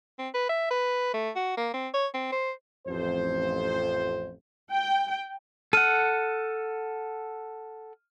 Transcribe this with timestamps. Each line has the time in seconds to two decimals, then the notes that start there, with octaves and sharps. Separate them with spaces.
0.18 C4
0.34 B4
0.49 E5
0.71 B4
1.14 A3
1.35 F#4
1.57 A#3
1.74 C4
1.94 C#5
2.14 C4
2.32 C5
2.87 A1 F2 C5
4.70 G5
5.73 A4 F#5 F6 D#7